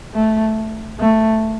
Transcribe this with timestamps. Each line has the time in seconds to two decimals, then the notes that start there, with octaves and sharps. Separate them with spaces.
0.14 A3
1.00 A3